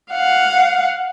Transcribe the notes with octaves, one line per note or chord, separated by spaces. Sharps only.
F5 F#5